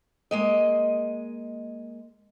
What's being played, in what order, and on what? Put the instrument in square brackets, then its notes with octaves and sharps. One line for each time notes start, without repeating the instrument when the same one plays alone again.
[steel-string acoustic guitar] G#3 A#3 D#5